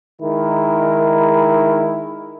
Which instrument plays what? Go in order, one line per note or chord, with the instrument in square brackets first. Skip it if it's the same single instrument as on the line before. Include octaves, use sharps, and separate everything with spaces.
[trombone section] D#3 G#3 E4 A#4